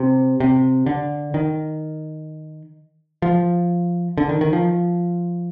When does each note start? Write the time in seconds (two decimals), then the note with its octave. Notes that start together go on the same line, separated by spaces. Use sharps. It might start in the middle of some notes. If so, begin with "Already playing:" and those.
Already playing: C3
0.40 C3
0.86 D3
1.34 D#3
3.22 F3
4.18 D3
4.29 D#3
4.41 D#3
4.53 F3